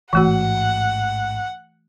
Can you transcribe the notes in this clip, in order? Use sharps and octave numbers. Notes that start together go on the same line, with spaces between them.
A1 G#2 E3 A3 F#4 F#5